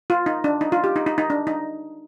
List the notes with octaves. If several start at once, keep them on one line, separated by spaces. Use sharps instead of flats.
F4
D#4
D4
D#4
F4
G4
D#4
D#4
D#4
D4
D#4